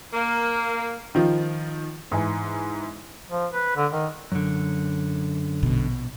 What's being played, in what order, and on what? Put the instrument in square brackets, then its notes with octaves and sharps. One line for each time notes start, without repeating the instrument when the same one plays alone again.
[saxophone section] A#3
[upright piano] D#3 F3 F4
[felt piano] G#2 E3 G#5
[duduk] F3
B4
D3
D#3
[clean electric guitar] F#2 D3
[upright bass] A#1 B2